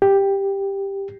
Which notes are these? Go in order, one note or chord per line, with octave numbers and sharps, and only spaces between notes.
G4